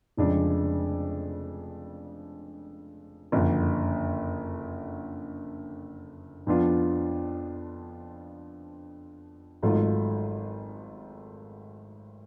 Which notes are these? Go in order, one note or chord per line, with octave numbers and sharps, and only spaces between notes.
F1 F2 C#3 G#3 D4
F#1 F2 D3
F2 F3 B3 D4 F4
G#1 G#2 F#3 A3 F4